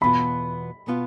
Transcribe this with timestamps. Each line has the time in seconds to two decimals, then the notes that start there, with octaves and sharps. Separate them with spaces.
0.01 E2 B2 B3 F4 B5
0.88 B2 B3 F4